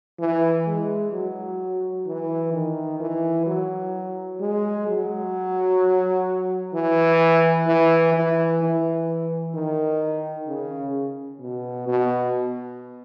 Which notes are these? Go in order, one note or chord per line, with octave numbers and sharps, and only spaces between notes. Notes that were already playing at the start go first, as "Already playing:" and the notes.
E3
G#3
F#3
E3
D#3
E3
F#3
G#3
F#3
E3
E3
E3
E3
D#3
C#3
B2
B2